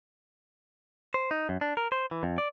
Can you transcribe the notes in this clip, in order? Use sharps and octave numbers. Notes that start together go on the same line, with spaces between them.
C5
D#4
F#2
D4
A#4
C5
E3
F2
D5